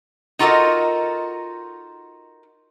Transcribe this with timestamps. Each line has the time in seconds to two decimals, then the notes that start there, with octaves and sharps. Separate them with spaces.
0.39 D#4 F4 F#4 A4 A#4 D#5